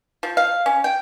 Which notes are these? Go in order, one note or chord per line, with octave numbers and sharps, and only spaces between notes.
F3
F5
C#4
G5